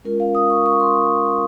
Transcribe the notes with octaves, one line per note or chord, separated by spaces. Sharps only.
G#3 C#4 F4 A#4
F5
D#6
C#6
C#6
C6